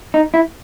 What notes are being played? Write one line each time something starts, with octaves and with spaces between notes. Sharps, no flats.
D#4
E4